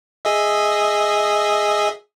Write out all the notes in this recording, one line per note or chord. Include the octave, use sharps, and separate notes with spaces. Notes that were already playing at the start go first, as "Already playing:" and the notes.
G#4 D#5 E5